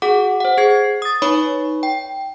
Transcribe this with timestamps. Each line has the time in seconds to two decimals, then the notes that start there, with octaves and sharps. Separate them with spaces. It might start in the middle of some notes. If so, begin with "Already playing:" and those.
0.02 F#4 G#4 F#5 D6
0.40 C5 F#5
0.58 G#4 G#6 C7
1.02 D#6 A6
1.22 D#4 B4 C#5 B5 C#6
1.83 G5